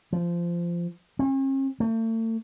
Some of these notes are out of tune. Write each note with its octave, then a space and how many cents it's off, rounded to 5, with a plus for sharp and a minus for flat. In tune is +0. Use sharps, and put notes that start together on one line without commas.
F3 -20
C#4 -45
A3 +40